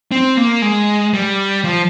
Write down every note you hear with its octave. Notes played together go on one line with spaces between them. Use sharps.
C4
A#3
G#3
G3
F3